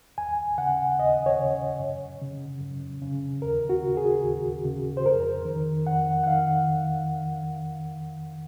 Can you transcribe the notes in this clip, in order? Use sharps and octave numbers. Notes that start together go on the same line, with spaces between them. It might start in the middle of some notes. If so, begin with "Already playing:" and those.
D#2 G#5
C#3 F#5
D#2 D#5
C#5
C#3
F#2
C#3
F#2
C#3
D#2 A#4
F#4
C#3
G#4
D#2
C#3
C5
F2 A#4
D#3
F2 F#5
F#5
D#3 F5